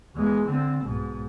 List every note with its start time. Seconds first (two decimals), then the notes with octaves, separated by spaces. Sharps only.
0.16 E2 G#3
0.48 D3 C4
0.84 B1 G#2